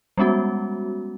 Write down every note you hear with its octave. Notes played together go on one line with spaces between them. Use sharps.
G3 G#3 B3 C#4 F#4